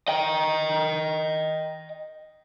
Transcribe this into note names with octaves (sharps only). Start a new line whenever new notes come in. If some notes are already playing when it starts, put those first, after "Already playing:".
D#5 G5